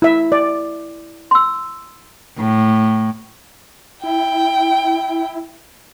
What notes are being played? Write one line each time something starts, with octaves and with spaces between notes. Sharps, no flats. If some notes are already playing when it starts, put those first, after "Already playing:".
E4 E5
D5
C6 E6
A2
E4 G5